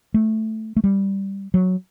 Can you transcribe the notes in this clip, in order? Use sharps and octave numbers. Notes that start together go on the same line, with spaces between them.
A3
A3
G3
F#3